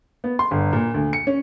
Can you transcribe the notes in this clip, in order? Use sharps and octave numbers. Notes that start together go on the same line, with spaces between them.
B3
C6
G1
A#2
D2
C#7
C#4